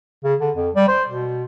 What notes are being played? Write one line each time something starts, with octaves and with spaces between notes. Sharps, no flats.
C#3
D3
F2
G3
C5
B2